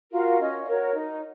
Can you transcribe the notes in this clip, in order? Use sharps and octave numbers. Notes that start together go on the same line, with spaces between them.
F4 F#4 A#4 F5
C#4 D#5
D#5
F#4 A#4 C#5
D#4